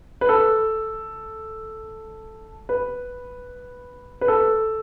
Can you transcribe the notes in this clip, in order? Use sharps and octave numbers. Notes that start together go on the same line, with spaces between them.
B4
A4
B4
B4
A4